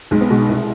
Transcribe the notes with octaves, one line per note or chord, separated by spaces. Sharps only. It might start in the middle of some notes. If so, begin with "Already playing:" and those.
B1 G#3
B3
B2 G#3
C2